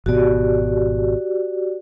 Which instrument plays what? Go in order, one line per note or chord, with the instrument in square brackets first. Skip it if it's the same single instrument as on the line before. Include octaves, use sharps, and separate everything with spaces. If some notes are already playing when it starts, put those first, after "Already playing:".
[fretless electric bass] G#1 B2 [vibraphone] F#4 G4 D5